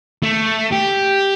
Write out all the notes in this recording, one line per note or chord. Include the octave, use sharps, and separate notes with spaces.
A3
G4